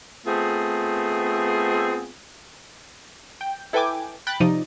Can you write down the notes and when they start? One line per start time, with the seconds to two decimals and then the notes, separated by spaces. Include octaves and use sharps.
0.26 A3 B3 C4 F4 G#4
3.41 G5
3.73 E4 A4 B4 G5 G#5 D6
4.27 G5 B5 F#6 A6
4.40 C3 F3 D#4 D5 D#5